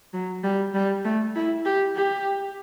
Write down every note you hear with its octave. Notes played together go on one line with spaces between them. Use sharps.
F#3
G3
G3
A3
E4
G4
G4